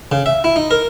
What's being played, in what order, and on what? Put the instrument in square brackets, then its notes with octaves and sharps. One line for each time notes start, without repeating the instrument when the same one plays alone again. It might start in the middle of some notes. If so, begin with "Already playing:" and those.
[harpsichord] C#3
E5
E4
D#4
A#4